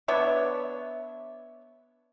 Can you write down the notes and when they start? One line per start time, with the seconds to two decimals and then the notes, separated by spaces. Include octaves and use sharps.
0.08 B3 D4 C#5 E5